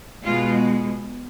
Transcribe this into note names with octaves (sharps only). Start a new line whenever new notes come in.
B2 G#3 F4